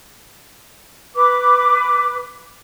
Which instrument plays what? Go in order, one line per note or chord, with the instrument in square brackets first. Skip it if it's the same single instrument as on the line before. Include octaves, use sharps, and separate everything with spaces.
[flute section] B4 D6